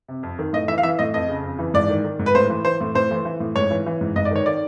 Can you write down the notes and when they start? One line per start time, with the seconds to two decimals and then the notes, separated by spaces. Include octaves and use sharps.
0.08 C3
0.23 F2
0.39 D#3
0.53 A2 D#5
0.68 E3 E5
0.78 F5
0.83 E3 E5
0.99 A2 D#5
1.14 F2 D#5
1.29 C#3
1.43 F2
1.59 E3
1.74 G#2 D5
1.89 D#3
2.04 D#3
2.19 G#2
2.26 B4
2.35 A2 C5
2.50 E3
2.65 E3 C5
2.81 A2
2.95 A2 C5
3.11 E3
3.25 E3
3.40 A2
3.56 G#2 C#5
3.70 E3
3.86 E3
4.01 G#2
4.16 G#2 D#5
4.25 D5
4.31 D#3 C#5
4.46 D#3 D5